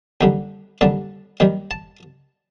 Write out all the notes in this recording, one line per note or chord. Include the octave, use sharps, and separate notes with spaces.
D#2 D3 G3 G5
D#2 D3 G3 A5
D#2 D#3 G3 G5
A5